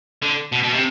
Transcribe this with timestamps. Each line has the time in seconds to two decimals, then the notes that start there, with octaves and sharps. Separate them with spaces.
0.22 D3
0.52 B2
0.63 B2
0.73 C3